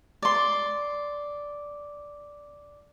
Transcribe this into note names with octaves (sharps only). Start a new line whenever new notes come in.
D5 C6